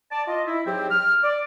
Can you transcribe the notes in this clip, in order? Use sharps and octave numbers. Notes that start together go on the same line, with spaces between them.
D5 A5
F4 D#5
E4
G#2 F#3 C4 G4
F6
D5